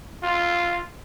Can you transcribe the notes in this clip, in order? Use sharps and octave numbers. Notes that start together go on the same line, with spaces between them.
F4